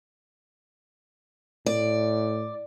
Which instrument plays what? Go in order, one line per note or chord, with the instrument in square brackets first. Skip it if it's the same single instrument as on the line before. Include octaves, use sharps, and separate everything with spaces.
[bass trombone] A2 [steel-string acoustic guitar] D5